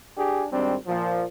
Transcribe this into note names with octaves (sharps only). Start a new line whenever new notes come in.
D4 G4 G#4
G#1 G3 C4 D4
A#2 F3